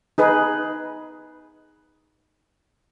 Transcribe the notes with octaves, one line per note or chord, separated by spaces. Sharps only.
D#4 G#4 B4